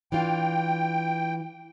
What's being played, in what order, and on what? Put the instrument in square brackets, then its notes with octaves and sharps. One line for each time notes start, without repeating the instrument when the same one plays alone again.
[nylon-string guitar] E3 D4 F4 [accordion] G5